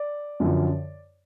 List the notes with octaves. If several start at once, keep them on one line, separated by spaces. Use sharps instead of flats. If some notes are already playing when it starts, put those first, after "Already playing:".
Already playing: D5
F#2 D3 F3